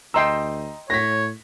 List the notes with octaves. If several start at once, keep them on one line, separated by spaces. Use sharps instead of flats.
D2 D#5 G5 A#5 C6 E6
A2 C#5 A#6 B6